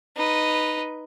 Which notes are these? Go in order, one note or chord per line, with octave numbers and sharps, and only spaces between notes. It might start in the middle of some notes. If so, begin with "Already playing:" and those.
D#4 B4